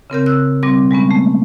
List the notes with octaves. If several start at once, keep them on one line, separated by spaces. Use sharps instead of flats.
C#3 C4 A#4 G6
E6 F#6
B2 G3 C4 D6
G3 G#3 B3 C#4
A3 A#3